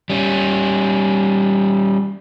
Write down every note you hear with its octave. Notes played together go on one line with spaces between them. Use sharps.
G3 C#4